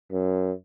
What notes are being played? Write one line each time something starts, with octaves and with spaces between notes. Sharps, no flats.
F#2